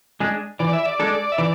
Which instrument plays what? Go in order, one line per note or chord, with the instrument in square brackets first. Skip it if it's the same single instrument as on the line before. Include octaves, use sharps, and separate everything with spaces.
[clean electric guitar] G#3 D4 G#4
[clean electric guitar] E3 [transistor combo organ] D5
[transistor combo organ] E5
D5
[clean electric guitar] G#3 D4 A4
[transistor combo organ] E5
[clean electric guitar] E3 [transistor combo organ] D5